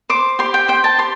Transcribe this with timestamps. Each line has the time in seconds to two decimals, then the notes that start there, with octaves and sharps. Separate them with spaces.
0.10 C5 D6
0.39 G4 C6
0.54 G5
0.68 C5 G5
0.84 A5
0.98 G4 C6